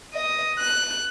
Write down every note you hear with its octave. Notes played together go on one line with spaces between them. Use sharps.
D#5
F#6